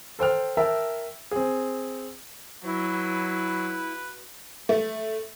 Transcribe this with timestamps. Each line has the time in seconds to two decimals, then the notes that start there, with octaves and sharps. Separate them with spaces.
0.19 A4 C5 G5 F6
0.57 A#4 E5 G5 A5
1.31 C4 G#4
2.64 F#3 E4 B4
4.69 A3